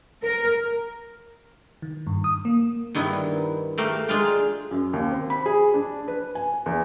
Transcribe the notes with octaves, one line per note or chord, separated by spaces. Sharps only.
A#4
D#3
G2
D#6
A#3
G2 D#3 B3 E4
A3 G4 A#4 F5
G#3 D4 F4 F5 G5
F#2
D#2
C4
B5
G#4
D4
B4
G#5
E2